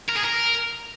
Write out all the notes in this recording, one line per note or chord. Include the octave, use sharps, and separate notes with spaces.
A#4
G#4
A#4